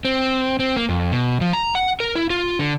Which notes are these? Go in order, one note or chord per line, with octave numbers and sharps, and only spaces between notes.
C4
C4
A#3
F2
B2
F3
A#5
F#5
A#4
E4
F4
D3